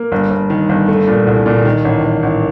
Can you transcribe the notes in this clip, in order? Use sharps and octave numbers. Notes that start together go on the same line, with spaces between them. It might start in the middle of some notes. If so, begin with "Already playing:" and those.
Already playing: A#3
G1
G1
D#3
G1
A3
A#2
C2
A#2
D#3
A1
A1
A1